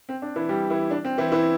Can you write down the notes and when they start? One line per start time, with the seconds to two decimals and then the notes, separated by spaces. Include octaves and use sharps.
0.09 C4
0.22 D4
0.36 E3 E4
0.49 G3 G4
0.70 E3 E4
0.91 D4
1.05 C4
1.18 E3 E4
1.32 E3 E4